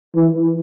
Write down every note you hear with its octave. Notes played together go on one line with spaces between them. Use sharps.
E3